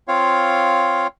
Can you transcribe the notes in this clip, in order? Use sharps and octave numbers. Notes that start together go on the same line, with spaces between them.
C4 F4 C#5 F5